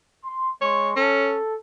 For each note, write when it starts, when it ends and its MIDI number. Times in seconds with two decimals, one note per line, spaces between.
0.25 0.49 84
0.61 0.92 56
0.61 0.90 73
0.61 0.92 84
0.61 0.92 85
0.96 1.37 61
0.96 1.55 69